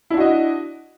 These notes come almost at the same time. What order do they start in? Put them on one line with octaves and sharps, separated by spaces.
E4 D4 F#4 D#5